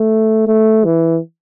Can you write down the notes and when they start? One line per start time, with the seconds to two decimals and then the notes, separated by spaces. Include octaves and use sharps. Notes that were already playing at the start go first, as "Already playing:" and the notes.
Already playing: A3
0.47 A3
0.85 E3